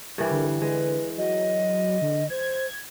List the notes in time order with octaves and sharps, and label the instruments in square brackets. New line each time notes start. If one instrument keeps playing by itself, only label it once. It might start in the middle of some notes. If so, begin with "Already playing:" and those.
[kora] G2 E3 G3 [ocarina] A#4
[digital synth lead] D3
[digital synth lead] D3 [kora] G#3 [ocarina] B4
[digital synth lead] F#3 [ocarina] D#5
[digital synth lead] D3
[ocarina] C5 [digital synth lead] G#6